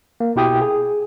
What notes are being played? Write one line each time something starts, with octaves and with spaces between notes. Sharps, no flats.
A#3
B2 E4 G4 G5 D#6
G#4